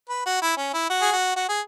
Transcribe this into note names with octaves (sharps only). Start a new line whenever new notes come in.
B4
F#4
E4
C#4
E4
F#4
G#4
F#4
F#4
G#4